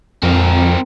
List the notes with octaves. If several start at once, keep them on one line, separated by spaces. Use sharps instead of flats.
F2 C4 A#4